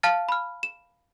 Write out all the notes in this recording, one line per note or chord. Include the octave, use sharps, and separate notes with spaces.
F5 A5 F6 A6
B5 F6
E7